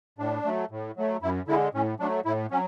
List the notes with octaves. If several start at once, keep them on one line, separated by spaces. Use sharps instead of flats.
A2 D4
F#3 A3
A2
F#3 A3
F#2 E4
D3 G#3 E4
A2 C#4
F#3 A3 D4
A2 E4
F#3 C#4